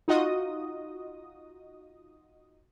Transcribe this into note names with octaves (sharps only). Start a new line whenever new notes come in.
D#4 F4 F#4 D#5 D#6